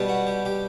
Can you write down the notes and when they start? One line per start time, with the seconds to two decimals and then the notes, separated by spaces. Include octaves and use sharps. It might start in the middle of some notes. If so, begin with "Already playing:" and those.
Already playing: B2 G3 B3
0.08 F#4
0.27 G4
0.45 G4